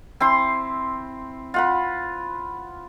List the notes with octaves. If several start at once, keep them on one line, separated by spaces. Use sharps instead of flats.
C4 E4 C6
F4 F#5 B5